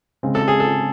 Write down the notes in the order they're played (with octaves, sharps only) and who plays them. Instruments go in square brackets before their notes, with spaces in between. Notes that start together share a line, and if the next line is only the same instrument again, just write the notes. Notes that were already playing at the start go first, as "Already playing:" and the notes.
[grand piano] C#3 G#3 C4
[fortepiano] A4
G#4
A4